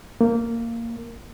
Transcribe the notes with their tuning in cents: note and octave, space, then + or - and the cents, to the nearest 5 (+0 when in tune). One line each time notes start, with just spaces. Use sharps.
A#3 -10